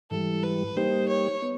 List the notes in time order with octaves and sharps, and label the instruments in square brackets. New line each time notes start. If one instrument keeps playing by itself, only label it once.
[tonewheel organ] G#2 E3 G3 [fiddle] A4
[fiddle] B4
[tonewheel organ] G3 A#3 D#4 G4 [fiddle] C5
[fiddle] C#5
[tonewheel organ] B3